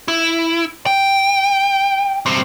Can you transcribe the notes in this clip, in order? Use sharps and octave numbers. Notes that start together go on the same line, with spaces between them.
E4
G5
G2 C4